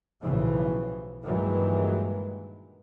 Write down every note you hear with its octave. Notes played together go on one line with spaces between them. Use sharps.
B1 A2 C#3 E3 F3
G2 A#2 D#3 E3 F#3 G#3